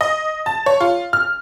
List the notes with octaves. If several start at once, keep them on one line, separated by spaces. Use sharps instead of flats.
D#5
A5
C#5
F4
F6